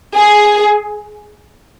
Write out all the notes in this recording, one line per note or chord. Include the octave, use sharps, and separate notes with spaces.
G#4